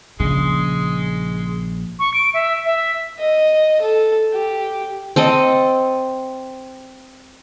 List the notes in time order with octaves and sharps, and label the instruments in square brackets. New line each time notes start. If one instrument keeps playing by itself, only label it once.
[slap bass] A#1 [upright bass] C#3 [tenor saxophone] G#3
[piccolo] C#6
D7
E5
E5
[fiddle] D#5
A4
G4
[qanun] C4 A4 D#5